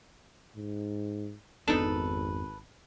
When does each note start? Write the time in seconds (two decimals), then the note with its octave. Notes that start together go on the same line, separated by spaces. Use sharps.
0.57 G#2
1.68 G#1 F2 B3 D4 D#4 A4 B4